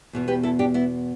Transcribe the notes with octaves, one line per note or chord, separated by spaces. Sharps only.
E2 B2 B3
G4 B4
E4 A4
D4 G4
B3 E4